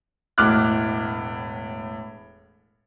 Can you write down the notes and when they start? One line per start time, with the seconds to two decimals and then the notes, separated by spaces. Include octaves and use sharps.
0.38 E1 A2 D6 F6 F#6